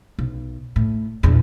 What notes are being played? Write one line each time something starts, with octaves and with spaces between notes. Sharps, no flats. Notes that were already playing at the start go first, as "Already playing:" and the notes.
B1
A2
A#1 E2